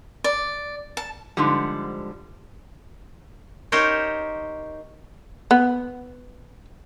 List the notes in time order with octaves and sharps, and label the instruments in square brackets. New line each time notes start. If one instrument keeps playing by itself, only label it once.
[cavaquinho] D5
A5
[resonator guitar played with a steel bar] G#2 D3 F3 G3
[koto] D#4 G4 A#4 C5 C#5
[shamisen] B3